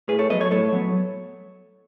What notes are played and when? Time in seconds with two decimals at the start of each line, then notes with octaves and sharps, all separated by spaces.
0.08 A2 G#4 B4
0.19 A4 C#5
0.30 F#3 B3 B4 D#5
0.40 A4 C#5
0.51 A2 A4 C#5
0.73 F#3 B3